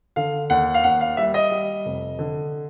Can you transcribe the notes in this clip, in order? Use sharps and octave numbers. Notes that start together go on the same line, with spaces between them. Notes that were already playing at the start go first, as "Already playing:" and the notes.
D3 F5
D#2 F#5
F5
D#2 F#5
F5
G3 E5
D#5
G3
F1
D3